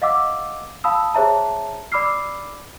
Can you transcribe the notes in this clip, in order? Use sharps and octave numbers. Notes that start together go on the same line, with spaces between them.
D#5 F5 F#5 D6 E6
F5 A5 B5 D#6 E6
G#4 C5 C#5 E5 A5 A#5
D5 B5 D6 E6 F6 C7